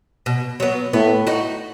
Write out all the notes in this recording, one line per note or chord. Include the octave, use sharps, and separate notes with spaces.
B2
F#3 B3
A2 B3
D#4 F#4